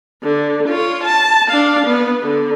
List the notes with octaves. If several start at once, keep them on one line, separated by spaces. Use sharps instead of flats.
D3
F4 C#5
A5
D4 F5
B3
D3